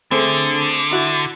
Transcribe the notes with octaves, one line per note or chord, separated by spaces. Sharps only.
D3 A3 C4 G#4
E4 F#4